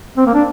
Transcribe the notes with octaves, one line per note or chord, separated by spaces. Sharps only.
C4
A#3
D4